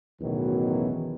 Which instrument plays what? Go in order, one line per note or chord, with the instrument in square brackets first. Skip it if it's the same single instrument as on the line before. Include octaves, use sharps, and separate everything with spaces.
[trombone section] A1 E2 B2 D#3 E3 F#3